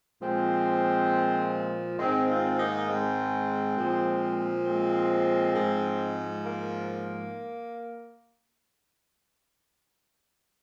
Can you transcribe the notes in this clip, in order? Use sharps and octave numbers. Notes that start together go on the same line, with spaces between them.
A#2 F3 G#3 C4
G#2 D#3 G#3 C4
C4 F4
A#3 D#4
G#3 C4
A#2 F3
G#3 C4
G#2 F3
A#3